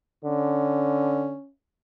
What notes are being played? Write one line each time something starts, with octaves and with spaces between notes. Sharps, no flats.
D3 C#4